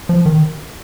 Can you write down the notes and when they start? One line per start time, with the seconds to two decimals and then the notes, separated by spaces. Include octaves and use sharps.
0.09 F3
0.26 D#3